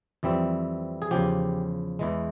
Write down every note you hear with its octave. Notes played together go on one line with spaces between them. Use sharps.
F2 E3 G3 C4
G#4
E2 C#3 F3 G4
E2 E3 G#3